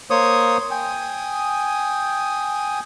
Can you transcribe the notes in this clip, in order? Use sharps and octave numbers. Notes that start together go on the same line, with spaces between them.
A#3 C5 C#5 C#6 D#6
G5 G#5 D#6